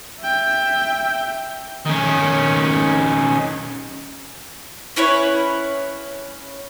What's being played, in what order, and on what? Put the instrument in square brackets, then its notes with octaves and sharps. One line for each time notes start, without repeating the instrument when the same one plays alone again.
[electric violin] E5 G5
[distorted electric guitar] D#3 C#4
[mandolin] C#4 E4 B4 C#5